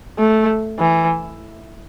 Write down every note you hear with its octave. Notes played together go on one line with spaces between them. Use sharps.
A3
E3